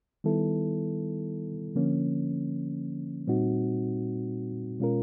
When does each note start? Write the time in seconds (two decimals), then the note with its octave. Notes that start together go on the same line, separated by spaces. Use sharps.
0.24 D#3 G3 B3 E4 A4
1.76 D3 F3 A#3 C#4
3.27 A#2 G3 C4 D#4 F#4
4.80 B2 G#3 C#4 F4 A#4